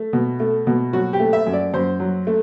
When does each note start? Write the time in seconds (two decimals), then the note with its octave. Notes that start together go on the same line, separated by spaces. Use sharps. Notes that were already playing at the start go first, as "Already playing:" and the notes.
Already playing: A3
0.13 B2
0.40 A3
0.67 B2
0.93 F#3 F#4
1.13 G4
1.20 A3
1.33 E5
1.47 F#2
1.53 D5
1.74 F#2 C5
2.00 F#3
2.27 A3